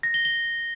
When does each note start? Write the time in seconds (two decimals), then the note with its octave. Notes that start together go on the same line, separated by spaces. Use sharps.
0.03 A#6
0.14 G7
0.25 G7